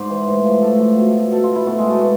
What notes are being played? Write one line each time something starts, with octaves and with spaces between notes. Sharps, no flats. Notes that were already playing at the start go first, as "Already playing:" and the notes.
Already playing: G#2 C5 D5
E3
A2
F3
A2 A4
F3
B2
B2 A4
F4
E4
B2 A3
G#3
A3
B2